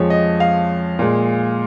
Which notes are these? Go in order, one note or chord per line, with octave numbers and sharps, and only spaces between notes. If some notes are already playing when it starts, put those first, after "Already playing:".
Already playing: F2 F3 G#3 C#5
D#5
F5
A#2 G#3